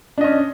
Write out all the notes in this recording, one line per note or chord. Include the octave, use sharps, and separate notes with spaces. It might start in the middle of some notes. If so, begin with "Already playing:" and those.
C#4 D4 D#5